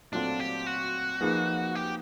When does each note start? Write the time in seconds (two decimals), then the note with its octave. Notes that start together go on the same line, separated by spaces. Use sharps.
0.12 A#2 F#3 A3 C4 D4 F4
0.40 G4
0.67 F#4
1.21 F3 A#3 D#4 G#4 B4
1.75 G4